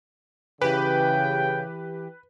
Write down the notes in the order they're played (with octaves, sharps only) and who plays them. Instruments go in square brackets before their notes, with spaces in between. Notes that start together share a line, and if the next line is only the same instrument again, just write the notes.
[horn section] C#3 G5 [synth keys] E3 G4 [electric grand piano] B4